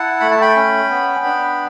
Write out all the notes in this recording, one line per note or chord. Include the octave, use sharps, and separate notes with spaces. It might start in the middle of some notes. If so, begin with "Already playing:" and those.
Already playing: E4 F#5 A5
A3 B5
A5
G5 B5
C#4
B3
D4